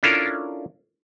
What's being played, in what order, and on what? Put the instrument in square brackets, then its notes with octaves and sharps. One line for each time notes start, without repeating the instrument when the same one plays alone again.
[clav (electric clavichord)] C#4 D4 E4 F4 A4 A#4